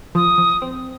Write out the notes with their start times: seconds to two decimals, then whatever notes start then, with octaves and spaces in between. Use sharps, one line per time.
0.15 F3 D#6
0.38 F3
0.62 C4